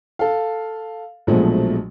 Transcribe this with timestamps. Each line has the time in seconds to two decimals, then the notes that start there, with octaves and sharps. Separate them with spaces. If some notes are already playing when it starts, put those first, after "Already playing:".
0.19 A4 F5
1.27 A#1 B2 F3 F#3 G#3 A3